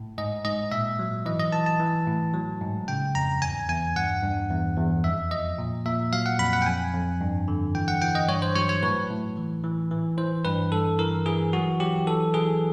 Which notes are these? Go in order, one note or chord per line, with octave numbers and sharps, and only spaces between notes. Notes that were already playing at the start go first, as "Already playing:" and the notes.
Already playing: A2
G#2 D#5
G#2 D#5
A#2 E5
F#3
E3 D#5
D#5
E3 A5
A5
E3
A2
F#3
G#2
C#3 G5
F2 A#5
E2 G#5
E2 G#5
G2 F#5
G2
E2
E2
F2 E5
F3 D#5
A#2
A#2 E5
F#3 F5
F#5
F2 B5
F#5
G5
F2 G#5
F2
G2
D3
E3 G5
F#5
E3 G5
D#5
G2 C#5
C5
F#3 C#5
C#5
A2 B4
A2
E3
E3
E3
E3 C5
G2 B4
G2 A4
E3 A#4
E3 G#4
F#3 F#4
F#3 G4
E3 A4
E3 G#4